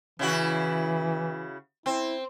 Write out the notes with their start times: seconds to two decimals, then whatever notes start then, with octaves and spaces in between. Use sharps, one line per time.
0.19 C#3 E3 E4 F#4
1.86 C4 E4